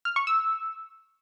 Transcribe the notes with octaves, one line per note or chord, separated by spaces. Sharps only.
F6
C#6
E6